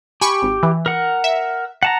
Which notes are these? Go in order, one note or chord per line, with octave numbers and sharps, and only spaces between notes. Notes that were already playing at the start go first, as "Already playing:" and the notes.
G4 G#5 B5 C#6
G#1
E3
A#4 F#5
E5
F#5 A5 A#5